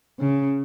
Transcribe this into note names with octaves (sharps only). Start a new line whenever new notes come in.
C#3